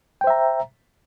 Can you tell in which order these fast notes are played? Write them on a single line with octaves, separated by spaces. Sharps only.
G5 C5 E5 A#5